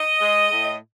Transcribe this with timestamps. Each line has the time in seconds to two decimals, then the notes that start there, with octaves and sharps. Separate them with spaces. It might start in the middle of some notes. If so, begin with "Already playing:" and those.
Already playing: D#5
0.20 G#3
0.51 A2